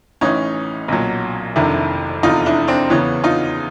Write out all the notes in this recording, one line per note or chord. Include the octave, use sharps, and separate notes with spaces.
A1 A2 E3 C#4 D#4
B1 A#2 F#3
F1 F2 C3 D#3 D4 E4
F1 E2 C3 D#4 F4
D4 E4
C4 D4
E2 C#3 E3 B3 C#4
D#4 F4